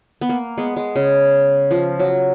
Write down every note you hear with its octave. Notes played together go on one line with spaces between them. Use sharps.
B3
A#3
G#3 B3
G#3
C#3
F3
F#3